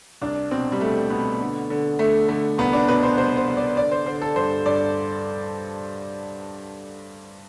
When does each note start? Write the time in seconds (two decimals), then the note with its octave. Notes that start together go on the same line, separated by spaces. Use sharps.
0.22 C2 D4
0.51 B2 C4
0.72 G3
0.80 B2 A3
1.10 B2 B3
1.40 D3
1.70 D3
1.99 D3 A3
2.28 D3 A3
2.58 C2 B3
2.73 D4
2.88 B2 B4
3.03 C5
3.17 C2 C5
3.37 C5
3.47 C2
3.57 D5
3.77 D3 D5
3.91 C5
4.06 D3 C5
4.22 A4
4.36 G2 C5
4.66 G2 D5